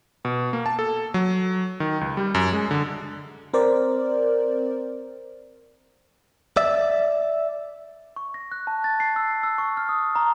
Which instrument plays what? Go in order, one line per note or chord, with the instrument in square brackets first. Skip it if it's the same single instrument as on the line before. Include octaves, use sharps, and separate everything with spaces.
[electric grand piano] B2
A#3
A5
A4
F#3
D#3
C#2
G3
F#2
G#3
D3
[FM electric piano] C4 A#4 C5 D5
[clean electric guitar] D5 E5
[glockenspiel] C#6
A#6
F#6
A5
A6
C7
E6
E6
C#6
F6
D#6
A#5